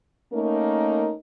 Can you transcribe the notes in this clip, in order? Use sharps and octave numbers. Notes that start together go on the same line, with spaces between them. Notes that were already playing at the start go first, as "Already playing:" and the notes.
A3 A#3 C#4 D#4 A#4